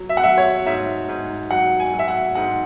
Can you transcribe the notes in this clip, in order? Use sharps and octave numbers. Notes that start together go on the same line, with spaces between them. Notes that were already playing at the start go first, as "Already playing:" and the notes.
Already playing: F#3
E5
F#5
F#3 E5
C#5
G#2 E5
G#2
F#3 F#5
G#5
F#3
E5
F#5
G#2 F#5